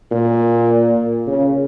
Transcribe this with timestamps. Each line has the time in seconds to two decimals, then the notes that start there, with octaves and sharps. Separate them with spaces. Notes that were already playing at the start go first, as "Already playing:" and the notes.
0.12 A#2
1.27 C#3